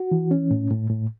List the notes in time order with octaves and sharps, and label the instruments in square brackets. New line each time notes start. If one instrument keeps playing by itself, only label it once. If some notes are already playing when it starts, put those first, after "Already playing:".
Already playing: [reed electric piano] F#4
E3
C#4
A2
A2
A2